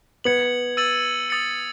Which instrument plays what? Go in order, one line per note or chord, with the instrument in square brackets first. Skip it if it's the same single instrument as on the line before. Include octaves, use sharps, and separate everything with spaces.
[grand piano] B3 [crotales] G#6 C#7 F#7
[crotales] E6 A6 D#7 F#7
D#6 A6 C#7